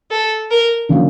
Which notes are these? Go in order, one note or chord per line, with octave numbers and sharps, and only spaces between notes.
A4
A#4
D3 F#3 A#3 C#4